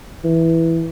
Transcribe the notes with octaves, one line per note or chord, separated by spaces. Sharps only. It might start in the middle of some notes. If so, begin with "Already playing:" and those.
E3